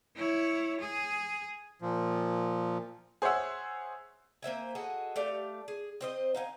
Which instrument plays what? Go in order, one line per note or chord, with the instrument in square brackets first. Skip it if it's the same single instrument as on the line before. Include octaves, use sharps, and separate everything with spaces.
[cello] E4 C#5
G#4
[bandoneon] A#2 F3
[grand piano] G#4 C5 C#5 E5 F#5 E6
[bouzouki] A#3 C5 E5 G#5
F#4 G#4 A4 D#5
A3 G4 D5 F5
G#4
C4 C5 D#5
D#4 F5 F#5 G#5